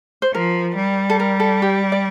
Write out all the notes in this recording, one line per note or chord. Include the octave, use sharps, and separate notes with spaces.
C5
F3 A#4
G3
A4
A#4
A4
G4
D5